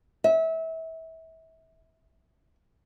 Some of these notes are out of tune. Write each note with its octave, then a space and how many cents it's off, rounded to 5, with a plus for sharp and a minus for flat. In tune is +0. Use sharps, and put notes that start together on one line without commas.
E5 -30